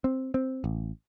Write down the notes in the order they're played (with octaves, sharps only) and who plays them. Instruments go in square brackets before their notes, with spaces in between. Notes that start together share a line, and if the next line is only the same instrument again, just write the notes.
[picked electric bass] C4
C4
A1